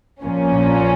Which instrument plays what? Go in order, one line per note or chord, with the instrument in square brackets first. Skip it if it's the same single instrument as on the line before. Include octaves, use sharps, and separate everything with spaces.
[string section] A#1 A#2 F3 A#3 C#4